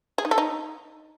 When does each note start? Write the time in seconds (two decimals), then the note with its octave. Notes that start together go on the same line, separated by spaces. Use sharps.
0.18 G#4
0.25 D#4
0.31 A4
0.38 D#4